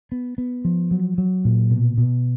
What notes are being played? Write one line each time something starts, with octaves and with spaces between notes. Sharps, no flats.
B3
B3
F3
F#3
F#3
A#2
B2
B2